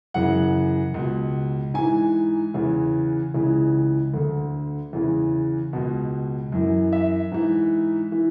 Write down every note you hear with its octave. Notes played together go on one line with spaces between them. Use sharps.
F#2 C#3 E3 F#5
C#2 B2
G#2 E3 G#5
E2 C#3 E3
C#2 C#3 E3
D2 D3
E2 C#3 E3
C#2 B2
F#2 E3
E5
G#2 E3
E3